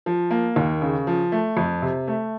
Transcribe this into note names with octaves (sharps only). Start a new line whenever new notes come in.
F3
A#3
D#2
C#3
F3
A3
F2
C3
A3